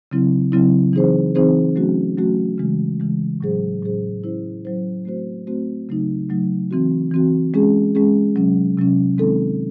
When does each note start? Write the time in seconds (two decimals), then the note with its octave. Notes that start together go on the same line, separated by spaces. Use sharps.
0.12 C#3 F#3 C4 E4
0.52 C#3 F#3 C4 E4
0.93 E3 C4 D#4 G#4 C5
1.35 E3 C4 D#4 G#4 C5
1.76 F#3 A3 C#4 F#4
2.18 F#3 A3 C#4 F#4
2.58 C#3 E3 G#3
3.00 C#3 E3 G#3
3.41 A2 F#3 C#4 G#4 C5
3.83 A2 F#3 C#4 G#4 C5
4.23 F#3 C#4 E4 C5
4.65 F#3 C#4 E4 C5
5.05 A3 C4 F#4 C5
5.47 A3 C4 F#4 C5
5.89 C#3 F#3 A3 D#4
6.30 C#3 F#3 A3 D#4
6.71 E3 C4 F#4
7.11 E3 C4 F#4
7.54 G#3 C#4 G#4
7.95 G#3 C#4 G#4
8.36 C3 F#3 C#4
8.77 C3 F#3 C#4
9.17 D#3 G#3 C4 D#4 A4